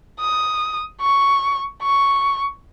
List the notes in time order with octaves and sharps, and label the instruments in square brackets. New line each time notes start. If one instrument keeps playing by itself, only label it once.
[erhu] D#6
C#6
C#6